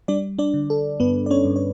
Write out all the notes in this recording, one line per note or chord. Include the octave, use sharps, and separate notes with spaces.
G3 D4 D5
D4 D5
D3
A4
G2 B3 B4
D5
C#4 C#5
G2
C#5